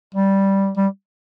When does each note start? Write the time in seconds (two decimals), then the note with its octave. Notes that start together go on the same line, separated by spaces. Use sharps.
0.15 G3
0.77 G3